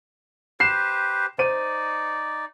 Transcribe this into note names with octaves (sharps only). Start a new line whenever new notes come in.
G4 B4 C5 C7 E7
D#4 C5 D5 D#7